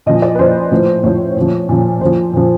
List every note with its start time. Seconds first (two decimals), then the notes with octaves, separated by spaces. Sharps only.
0.06 A#2 F3 D#5
0.22 D5
0.35 B4
0.39 A#2 F3 C5
0.71 A2 F3
1.03 A2 F3 C#5
1.36 A#2 F3
1.69 A#2 F3
2.01 A#2 F3 C5
2.33 A#2 F3